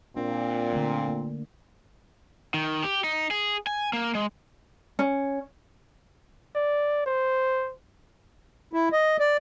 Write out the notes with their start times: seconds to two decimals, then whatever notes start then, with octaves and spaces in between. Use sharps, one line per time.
0.16 A#2 C4 D4
0.73 D3 A3
1.08 A#3
2.54 D#3
2.84 G4
3.04 D#4
3.31 G#4
3.67 G#5
3.93 A#3
4.15 G#3
4.99 C#4
6.55 D5
7.06 C5
8.73 E4
8.92 D#5
9.20 D5